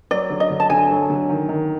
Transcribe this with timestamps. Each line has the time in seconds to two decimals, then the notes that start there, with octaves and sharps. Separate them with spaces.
0.11 F#3 D5
0.30 D3
0.40 D#5
0.50 D3
0.60 A5
0.70 D3 G#5
0.90 F#3
1.10 D3
1.29 D#3
1.49 D#3